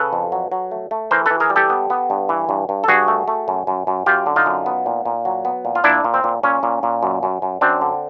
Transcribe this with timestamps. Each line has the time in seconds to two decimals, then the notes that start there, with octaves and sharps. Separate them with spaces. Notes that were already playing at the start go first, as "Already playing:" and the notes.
Already playing: C#3 A4 B4
0.13 F2
0.32 F#3
0.52 F#3
0.71 A3
0.91 A3
1.11 E3 A#4 C5
1.26 E3 A4 B4
1.40 G#4 A#4
1.50 G3
1.56 G4 A4
1.70 B3
1.90 B3
2.10 G2
2.29 E3
2.49 G2
2.69 G2
2.84 A4
2.88 G2 F#4 G#4
3.08 A3
3.28 A3
3.48 F#2
3.67 F#2
3.87 F#2
4.06 F#2 F4 G4
4.26 D3
4.36 D#4 F4
4.46 F#2
4.66 B3
4.86 A#2
5.05 A#2
5.25 F#3
5.45 B3
5.65 A#2
5.75 F4
5.84 A#2 D4 E4
6.04 A#2
6.14 C4
6.24 A#2
6.43 A#2 C#4
6.63 A#2
6.83 A#2
7.03 F#2
7.23 F#2
7.42 F#2
7.61 F#2 C4 D4
7.81 D3